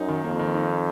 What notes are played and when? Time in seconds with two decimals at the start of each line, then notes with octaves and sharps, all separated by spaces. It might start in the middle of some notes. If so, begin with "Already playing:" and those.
Already playing: F#2 D#4
0.08 D#3
0.24 F2 A#3
0.39 D#3
0.54 D#4